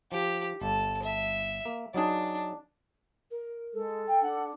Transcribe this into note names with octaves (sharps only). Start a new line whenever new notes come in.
F3 G4
G1 A4
E5
A#3
F#3 D4 D#4 G#4
A#4
G#3 A4
G5
D4 F#5